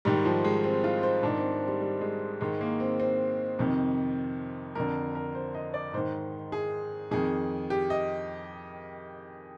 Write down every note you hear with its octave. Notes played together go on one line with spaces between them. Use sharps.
G#2 D#3 G3
F3
G#3
C4
F4
C5
G#2 D#3 D4
C4
C4
G3
G3
G#3
G#2 D#3 G#3
A#3
C4
C4
F2 C3 D#3
F2 D3 A#4
A#4
C5
D#5
D5
G#2 D#3 C5
G#4
F2 D#3 G#4
G4
D#5